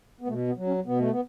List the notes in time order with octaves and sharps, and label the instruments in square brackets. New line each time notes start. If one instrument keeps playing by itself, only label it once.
[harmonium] B3
B2 A3
B3
F#3
C#4
B2 B3
A3
B3